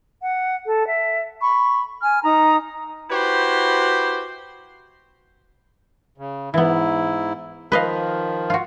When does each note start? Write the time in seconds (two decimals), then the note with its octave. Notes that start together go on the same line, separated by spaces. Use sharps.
0.21 F#5
0.65 A4
0.86 E5
1.41 B5 C#6
2.01 G#5 F6
2.24 D#4 A#5 D#6
3.10 E4 F#4 G4 B4 C5
6.18 C#3
6.54 G#2 E3 B3 E4
7.72 D#3 F3 B4 D#5 F5
8.50 F4 F#4